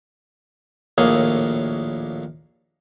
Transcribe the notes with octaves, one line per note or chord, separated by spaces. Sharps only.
A#1 D#2 A2 A#3 G#4 C#5